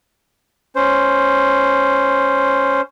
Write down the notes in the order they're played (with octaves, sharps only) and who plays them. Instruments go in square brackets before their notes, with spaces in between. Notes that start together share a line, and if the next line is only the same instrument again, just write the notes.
[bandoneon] C#4 C5